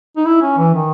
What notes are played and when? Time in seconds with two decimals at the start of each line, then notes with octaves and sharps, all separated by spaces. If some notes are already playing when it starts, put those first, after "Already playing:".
0.17 D#4
0.26 E4
0.42 C#4
0.58 E3
0.74 D#3